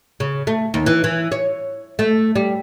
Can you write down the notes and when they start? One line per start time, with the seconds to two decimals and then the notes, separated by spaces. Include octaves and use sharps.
0.20 C#3
0.47 A3
0.74 D#2
0.86 E3
1.04 E3
1.32 C#5
1.99 A3
2.36 G3